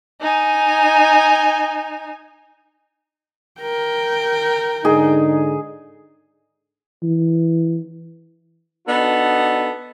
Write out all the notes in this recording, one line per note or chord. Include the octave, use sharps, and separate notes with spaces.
D#4 G#5
A#4 G5
G#2 D3 D#4 G#4
E3
B3 D4 D#4 F#4 A4